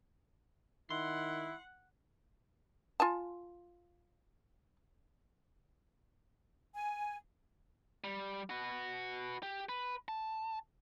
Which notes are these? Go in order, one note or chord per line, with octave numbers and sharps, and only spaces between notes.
D#3 E4 F#5 C6
F4 G#5 A5
G#5
G3
F#4 B4
G4
B4
A5